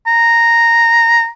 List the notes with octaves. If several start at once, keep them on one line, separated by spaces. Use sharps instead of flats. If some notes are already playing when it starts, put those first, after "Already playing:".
A#5